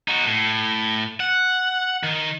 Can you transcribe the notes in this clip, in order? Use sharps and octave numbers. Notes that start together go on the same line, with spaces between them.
D#4 F#4
A2
F#5
D#3